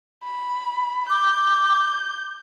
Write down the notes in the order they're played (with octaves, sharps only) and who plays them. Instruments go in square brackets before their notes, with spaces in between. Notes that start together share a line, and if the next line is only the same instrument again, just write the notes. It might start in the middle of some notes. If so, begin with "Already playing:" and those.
[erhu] B5
[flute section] D6 [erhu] G6